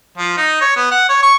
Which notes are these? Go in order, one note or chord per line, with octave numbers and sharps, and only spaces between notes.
F3
D#4
C#5
B3
F#5
C#5
C#6